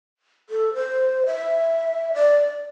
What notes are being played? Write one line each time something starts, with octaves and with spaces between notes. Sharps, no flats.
A4
C5
E5
D5